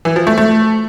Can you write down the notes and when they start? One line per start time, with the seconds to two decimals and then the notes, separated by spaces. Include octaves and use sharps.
0.05 E3
0.16 F3
0.27 A3
0.38 A3